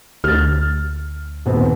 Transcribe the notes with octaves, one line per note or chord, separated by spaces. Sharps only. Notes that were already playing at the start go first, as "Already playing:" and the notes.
D2 F6 A6
D#1 B3 C4